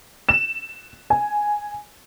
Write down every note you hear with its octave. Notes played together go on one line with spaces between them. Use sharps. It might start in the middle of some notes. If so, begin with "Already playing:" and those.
E7
G#5